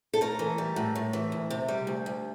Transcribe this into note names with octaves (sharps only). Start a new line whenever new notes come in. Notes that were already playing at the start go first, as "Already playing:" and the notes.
A4
A2 A#4
E3
G3
A2
A2
E3
D2
C3
G3
D2
D2